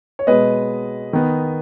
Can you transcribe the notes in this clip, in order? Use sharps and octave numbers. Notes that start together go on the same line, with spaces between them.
C#5
B2 G#3 B3 B4 D#5
D#3 B3